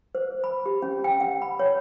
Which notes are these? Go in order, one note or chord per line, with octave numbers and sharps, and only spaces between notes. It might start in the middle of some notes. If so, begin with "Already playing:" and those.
C5
B5
G4
C#4
G5
F#5
B5
C#5